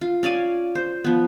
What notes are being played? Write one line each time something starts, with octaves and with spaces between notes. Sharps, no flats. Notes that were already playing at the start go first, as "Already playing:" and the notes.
F4
C#4 D5 F5 G#5
C5
F3 B3